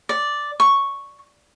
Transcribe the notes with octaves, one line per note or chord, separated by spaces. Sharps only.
D5
C#6